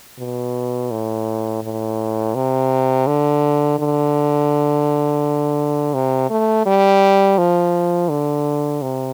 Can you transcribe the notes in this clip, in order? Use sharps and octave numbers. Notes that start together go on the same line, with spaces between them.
B2
A2
A2
C3
D3
D3
C3
A3
G3
F3
D3
C3